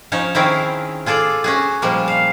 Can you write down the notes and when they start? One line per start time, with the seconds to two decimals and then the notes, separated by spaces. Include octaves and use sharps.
0.12 F3 C#4 D#4 C#5
0.35 D#3 C4 C#4 E4 G#4 A#4
1.06 F4 G#4 A4 D5
1.44 C#4 F#4 G#4
1.82 A#2 F3 G3 G#3 A#3
2.08 F5